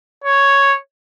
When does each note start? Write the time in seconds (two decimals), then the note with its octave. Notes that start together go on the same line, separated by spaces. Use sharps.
0.24 C#5